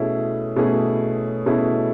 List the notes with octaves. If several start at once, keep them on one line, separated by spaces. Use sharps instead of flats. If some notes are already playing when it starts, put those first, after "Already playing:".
Already playing: B2 A3 C#4 E4 G#4
B2 A3 C#4 E4 G#4
B2 A3 C#4 E4 G#4